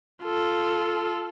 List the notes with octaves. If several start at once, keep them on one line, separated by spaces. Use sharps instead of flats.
F4 A4